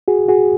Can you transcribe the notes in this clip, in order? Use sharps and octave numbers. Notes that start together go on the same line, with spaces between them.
F#4 G#4
F#4 G#4